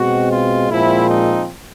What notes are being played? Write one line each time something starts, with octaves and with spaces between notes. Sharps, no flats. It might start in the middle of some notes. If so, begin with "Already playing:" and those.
Already playing: B2 G#3 C4 F#4
F4
A#2 F3 G#3 C4 E4
D#4